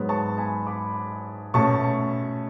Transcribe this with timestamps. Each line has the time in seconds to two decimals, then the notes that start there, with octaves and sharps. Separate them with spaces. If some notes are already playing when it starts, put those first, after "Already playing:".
Already playing: G#2 F#3 B3
0.09 A5 C#6
0.38 G#5 B5
0.67 B5 D6
1.54 B2 A3 C#4 A5 C#6